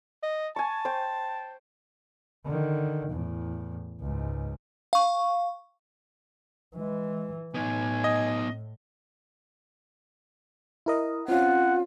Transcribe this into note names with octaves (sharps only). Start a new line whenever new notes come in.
D#5
G#5 A5 C#6
C5 G5
D3 D#3
E2 A2
C#2 G#2
F5 C#6
E3 G#3
A2 B3 D#4 G#5
D#5
E4 A#4 D#5
C4 C#4 F4 F#5